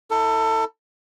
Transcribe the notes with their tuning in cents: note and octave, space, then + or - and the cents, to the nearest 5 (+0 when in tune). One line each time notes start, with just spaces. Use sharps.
E4 -35 A4 +25